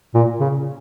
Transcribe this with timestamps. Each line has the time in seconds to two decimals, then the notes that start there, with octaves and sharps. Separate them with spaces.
0.14 A#2
0.40 C#3